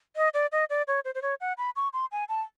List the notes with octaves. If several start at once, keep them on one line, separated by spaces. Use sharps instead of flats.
D#5
D5
D#5
D5
C#5
C5
C5
C#5
F#5
B5
C#6
C6
G#5
A5